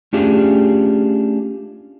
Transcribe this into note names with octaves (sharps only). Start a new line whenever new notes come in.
A3 C#4 D4 F4 G4 G#4